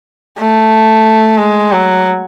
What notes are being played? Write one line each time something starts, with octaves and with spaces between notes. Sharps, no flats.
A3
G#3
F#3